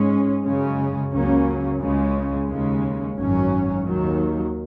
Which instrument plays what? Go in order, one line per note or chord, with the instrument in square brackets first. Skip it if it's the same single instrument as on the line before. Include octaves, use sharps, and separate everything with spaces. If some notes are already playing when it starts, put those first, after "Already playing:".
Already playing: [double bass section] G#2 G#3 C#4
F#2 C#3 G#3 C#4
C#2 C#3 F#3 A#3 C#4
C#2 C#3 G#3 C#4
D#2 C#3 G#3 C#4
G#1 F#2 F#3 C#4
D#2 D#3 F#3